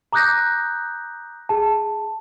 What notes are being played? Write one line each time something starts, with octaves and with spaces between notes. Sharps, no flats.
A#5 D6 D#6 F#6 G6 A#6
G#4 A5